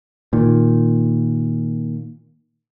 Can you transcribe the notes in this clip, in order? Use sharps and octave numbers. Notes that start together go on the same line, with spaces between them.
A#2 D#3